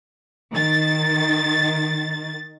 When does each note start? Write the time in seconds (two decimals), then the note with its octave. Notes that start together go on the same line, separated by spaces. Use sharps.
0.52 D#3 A6